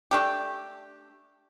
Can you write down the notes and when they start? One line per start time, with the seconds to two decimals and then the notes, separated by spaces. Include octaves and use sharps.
0.11 A3 D4 G4